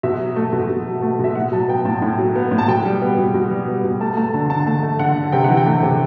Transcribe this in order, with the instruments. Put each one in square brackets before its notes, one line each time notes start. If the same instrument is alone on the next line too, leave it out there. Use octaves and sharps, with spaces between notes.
[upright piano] B2 E5
F#3
A3
B2
B2
F#3
A3
B2 E5
A2 F#5
F#3 A5
B3 G5
A2 A5
A2
F#3
B3
A2
A5
B2 G5
G3
B3
B2
B2
G3
B3
B2
A3 A5
A3 A5
D3 A5
D3 A5
A3 A5
A3
D3 F#5
D3
C3 G5
F#5
E3
G5
A3
C3